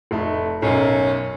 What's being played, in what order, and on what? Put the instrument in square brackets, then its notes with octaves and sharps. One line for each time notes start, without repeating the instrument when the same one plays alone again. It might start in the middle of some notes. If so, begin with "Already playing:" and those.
[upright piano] F1 A3 D#4
[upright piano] B1 F#2 [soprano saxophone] C#4